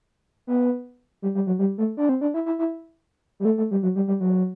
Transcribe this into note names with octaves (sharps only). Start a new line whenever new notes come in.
B3
G3
G3
F#3
G3
A3
D4
C4
D4
E4
E4
E4
G3
A3
A3
G3
F#3
G3
G3
F#3